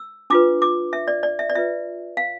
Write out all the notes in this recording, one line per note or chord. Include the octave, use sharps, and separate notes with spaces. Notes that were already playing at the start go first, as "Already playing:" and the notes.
Already playing: E6
D4 F4 B4 D6
D6
E5
D5
D5
E5
D5
F4 B4 E5
F5